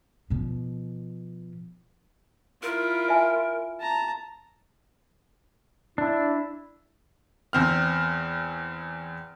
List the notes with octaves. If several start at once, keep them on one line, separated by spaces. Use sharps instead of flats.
B2 F3
E4 F4 A#4
E5 G#5
A5 A#5
D4 E4
E2 C4 F6